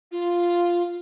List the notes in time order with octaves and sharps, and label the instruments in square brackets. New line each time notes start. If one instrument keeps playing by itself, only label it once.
[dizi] F4